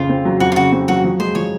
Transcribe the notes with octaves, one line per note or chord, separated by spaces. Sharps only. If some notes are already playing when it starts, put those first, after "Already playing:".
Already playing: F2 C#3 F4
C4
F#3
F2 F#4
F4
C#3 F#4
C4
F#3 F#4
F3
G#3 C5
F3 C#5